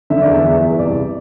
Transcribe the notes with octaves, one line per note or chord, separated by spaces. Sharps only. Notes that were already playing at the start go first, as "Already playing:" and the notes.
D3 E5
D5
E2
E5
E2
E2
C2 D5